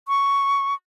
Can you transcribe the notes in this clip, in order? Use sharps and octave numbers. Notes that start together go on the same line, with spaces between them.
C#6